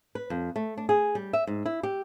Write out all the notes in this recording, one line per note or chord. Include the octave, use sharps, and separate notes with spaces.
B4
F2
A3
D4
G#4
G3
E5
G#2
E4
G4